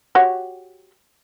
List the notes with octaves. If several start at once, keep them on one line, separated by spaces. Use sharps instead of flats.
F#4 G4 C#5